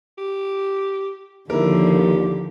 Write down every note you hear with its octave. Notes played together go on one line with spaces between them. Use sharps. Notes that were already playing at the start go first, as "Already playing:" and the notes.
G4
D#2 D3 F3 E4 G4 A#4